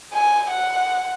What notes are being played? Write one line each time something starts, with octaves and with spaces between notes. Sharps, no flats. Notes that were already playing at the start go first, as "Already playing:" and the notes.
G#5
F#5